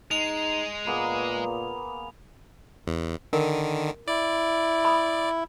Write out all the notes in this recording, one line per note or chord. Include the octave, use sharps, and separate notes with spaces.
G#3 D#4 F7
A#2 A#3 B3 G#4
E2
D3 D#3 A#4
E4 D5
B5 D#6